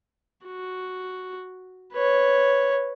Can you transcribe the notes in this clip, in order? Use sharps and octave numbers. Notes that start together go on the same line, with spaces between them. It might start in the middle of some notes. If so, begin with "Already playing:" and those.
F#4
B4 C#5